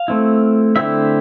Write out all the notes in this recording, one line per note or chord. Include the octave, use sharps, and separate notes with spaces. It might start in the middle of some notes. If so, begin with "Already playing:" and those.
Already playing: F5
A3 C4 E4
D3 A3 C4 E4 E5